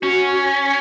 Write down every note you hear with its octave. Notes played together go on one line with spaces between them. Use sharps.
C#4 F#4